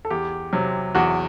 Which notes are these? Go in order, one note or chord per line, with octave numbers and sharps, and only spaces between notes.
A4
E2 G4
C3 F#3
E2 F#4